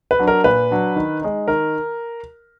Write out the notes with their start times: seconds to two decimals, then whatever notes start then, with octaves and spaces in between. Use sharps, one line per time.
0.11 B4
0.19 F#3 D4
0.28 A#4
0.44 A#2 B4
0.71 F#3 D4
0.96 D#3
1.22 G#3 D#4
1.48 D#3 A#4